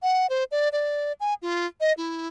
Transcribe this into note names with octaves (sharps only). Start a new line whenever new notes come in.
F#5
C5
D5
D5
G#5
F4
D#5
E4